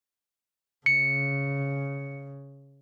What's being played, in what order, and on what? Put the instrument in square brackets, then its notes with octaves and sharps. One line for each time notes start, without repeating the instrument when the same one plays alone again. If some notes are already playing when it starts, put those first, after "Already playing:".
[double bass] C#3 [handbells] C#7